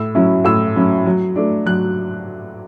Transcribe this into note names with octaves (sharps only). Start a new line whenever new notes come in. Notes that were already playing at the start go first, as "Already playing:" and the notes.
Already playing: A2 E6
F#3 C#4 E4
A2 E6
F#3 C#4 E4
F#3
A3 D4
F#3 F#6